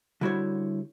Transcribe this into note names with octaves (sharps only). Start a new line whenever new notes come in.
D3 G3 E4 F#4 C5 C#5